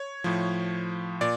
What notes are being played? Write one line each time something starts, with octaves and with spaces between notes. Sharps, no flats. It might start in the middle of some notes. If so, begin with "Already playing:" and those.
Already playing: C#5
A2 F3
A#2 D5